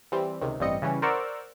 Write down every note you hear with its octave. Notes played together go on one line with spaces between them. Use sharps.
E3 G3 C4
C#2 C3 D#3
A1 G2 G3 C4 D#5 C#7
C#3 E3 G3 C#4
A#4 C5 D5 F#5 C#6 E6